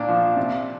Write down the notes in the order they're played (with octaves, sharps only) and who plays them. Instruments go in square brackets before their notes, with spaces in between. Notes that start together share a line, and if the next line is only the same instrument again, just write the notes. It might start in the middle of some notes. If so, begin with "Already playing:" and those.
Already playing: [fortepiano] A#2 D4
F3
C3